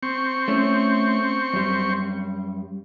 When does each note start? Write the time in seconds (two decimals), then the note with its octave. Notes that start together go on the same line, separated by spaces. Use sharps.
0.03 C4 C#6
0.48 A3 C#4
1.53 F#2 G3